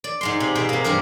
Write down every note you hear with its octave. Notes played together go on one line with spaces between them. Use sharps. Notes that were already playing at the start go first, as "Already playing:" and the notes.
D5
G#2 G#3 C6
C3
B2 G#4 G5
C3 A#3
G2 D4 G4 A#4 C5